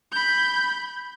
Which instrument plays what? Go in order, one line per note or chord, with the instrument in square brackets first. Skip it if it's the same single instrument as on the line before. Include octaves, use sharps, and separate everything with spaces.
[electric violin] B5 G6